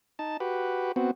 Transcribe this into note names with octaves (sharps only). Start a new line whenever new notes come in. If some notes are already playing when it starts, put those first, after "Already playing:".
D#4 A5
F#4 G4 B4
B3 C4 F#4